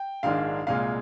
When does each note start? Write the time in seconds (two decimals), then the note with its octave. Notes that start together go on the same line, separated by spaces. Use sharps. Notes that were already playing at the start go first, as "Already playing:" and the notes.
Already playing: G5
0.23 A#1 G#2 D#3 G#3 D4 F5
0.67 C2 A#2 G#3 F5